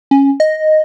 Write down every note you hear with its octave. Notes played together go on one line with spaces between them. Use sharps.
C#4
D#5